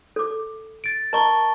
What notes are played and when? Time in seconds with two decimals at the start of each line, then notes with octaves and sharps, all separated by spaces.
0.16 A4 D6
0.84 A6 D7
1.13 A#4 D#5 A5 A#5 C#6 G7